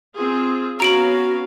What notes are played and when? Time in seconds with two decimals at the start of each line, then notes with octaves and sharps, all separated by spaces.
0.14 C4 F4 G#4
0.80 B3 C#4 F#4 F5 A#5 D7 F#7